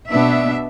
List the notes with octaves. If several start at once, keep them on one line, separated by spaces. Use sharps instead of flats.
B2 B3 D4 E5